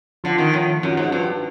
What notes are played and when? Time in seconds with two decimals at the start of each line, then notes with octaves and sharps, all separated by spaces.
0.24 D3 F3 F4
0.38 D#3
0.54 A2
0.83 F#2
0.97 G#2
1.12 G2